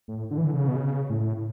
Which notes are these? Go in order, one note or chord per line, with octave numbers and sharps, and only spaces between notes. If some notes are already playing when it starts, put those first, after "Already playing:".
A2
D3
E3
D3
C#3
B2
C#3
A2